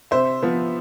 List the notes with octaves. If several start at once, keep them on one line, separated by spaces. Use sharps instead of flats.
C3 C5 E5
F3 B3